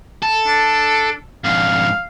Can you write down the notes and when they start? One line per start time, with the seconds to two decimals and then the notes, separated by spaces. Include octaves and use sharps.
0.23 A4
0.47 D4
1.45 F2 G#2 F5